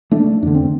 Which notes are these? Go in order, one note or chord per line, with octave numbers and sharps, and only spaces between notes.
A3 D4
F2 D3 D4
C4